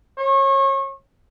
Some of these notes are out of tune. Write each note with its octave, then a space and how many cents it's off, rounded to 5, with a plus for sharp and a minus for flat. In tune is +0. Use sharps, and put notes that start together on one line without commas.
C#5 -30